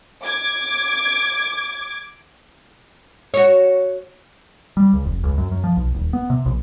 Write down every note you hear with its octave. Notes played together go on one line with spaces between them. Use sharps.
D6 G#6
F#4 C#5
G3
C#2
F1
C#2
F#2
F#2
F3
B1
D#1
B3
C3
A#1